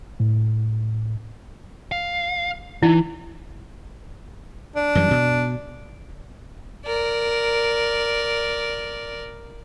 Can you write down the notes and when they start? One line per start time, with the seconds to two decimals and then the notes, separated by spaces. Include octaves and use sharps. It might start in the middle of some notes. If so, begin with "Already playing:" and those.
0.20 A2
1.92 F5
2.83 E3 D#4 E4
4.76 D4
4.95 F#2 E3 G3
5.11 B2
6.86 A#4 D5